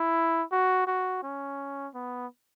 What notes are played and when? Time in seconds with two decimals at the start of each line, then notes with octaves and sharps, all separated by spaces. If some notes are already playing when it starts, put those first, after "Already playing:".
Already playing: E4
0.52 F#4
0.87 F#4
1.23 C#4
1.94 B3